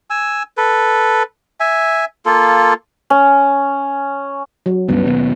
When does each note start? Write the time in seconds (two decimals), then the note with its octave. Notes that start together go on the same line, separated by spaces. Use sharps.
0.10 G#5 E6
0.57 A4 B4
1.60 E5 G#5
2.26 A#3 F4 A4
3.10 C#4
4.66 F#3
4.88 C#2 G2 C#3 B3
5.06 D#2 B2